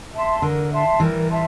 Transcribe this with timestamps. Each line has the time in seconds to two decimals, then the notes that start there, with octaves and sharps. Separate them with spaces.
0.13 E5 A5 C6
0.42 D3 A#4
0.71 E5 A5 C6
1.00 E3 G3 A#4
1.30 E5 A5 C6